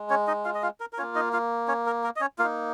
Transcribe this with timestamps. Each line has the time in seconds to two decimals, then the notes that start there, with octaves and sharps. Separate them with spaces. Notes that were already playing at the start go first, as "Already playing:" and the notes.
Already playing: G#3
0.10 C#4 C#5
0.28 D#4 D#5
0.45 F4 F5
0.55 D#5
0.63 F4 F5
0.80 A#4
0.93 A#4
0.98 C#4 F4 C#5
1.02 A#3
1.15 D#4 D#5
1.33 F4 F5
1.68 C#4 C#5
1.86 A#4
2.04 A#4
2.16 D#5
2.21 C#4 C#5
2.38 A#3 F4 F5
2.44 D#4